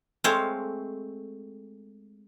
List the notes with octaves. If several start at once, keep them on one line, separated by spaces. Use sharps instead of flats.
G#3 A3 C4 C5 C#5 F5